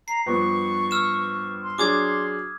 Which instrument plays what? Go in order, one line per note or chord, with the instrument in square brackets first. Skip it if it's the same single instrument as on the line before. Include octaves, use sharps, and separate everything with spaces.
[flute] A#5 [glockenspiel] C7
[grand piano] G2 F3 B3 [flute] C#6
[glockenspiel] E6 F6 E7
[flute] C6
[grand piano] F#3 D4 G#4 [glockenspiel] D6 D#6 G#6